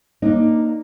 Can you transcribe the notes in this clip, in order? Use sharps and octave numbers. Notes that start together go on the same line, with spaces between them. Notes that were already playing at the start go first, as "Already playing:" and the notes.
A#3 D4 D#4